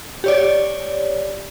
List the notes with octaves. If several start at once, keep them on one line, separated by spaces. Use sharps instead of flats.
G4 C#5 D5